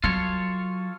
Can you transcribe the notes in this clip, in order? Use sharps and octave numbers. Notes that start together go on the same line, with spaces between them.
F#3 F4 A4 C#5